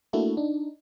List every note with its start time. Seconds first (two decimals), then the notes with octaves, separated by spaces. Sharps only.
0.13 A3 A#3 D4 E4 F#4 A4
0.37 D4 D#4